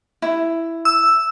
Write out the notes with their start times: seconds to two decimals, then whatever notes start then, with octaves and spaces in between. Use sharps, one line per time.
0.22 E4
0.85 E6